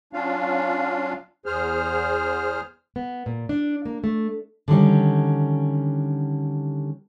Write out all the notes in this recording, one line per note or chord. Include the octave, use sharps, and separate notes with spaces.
F#3 C#4 D4 F4 F5
E2 G#4 C5 F6
B3
A#2
D4
A#3
A3
D3 D#3 G3 C#4